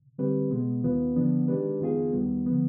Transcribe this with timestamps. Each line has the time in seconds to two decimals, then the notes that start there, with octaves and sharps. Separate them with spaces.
0.18 D3 G3 C4 G4 B4
0.50 B2 G#3 B3
0.83 D#2 D#3 B3 F4 B4
1.16 D3 F3 B3 D4
1.48 D#3 G#3 D4 G4 B4
1.80 F2 D#3 B3 F4 G#4
2.13 D#2 D#3 G3 B3
2.46 D3 F3 B3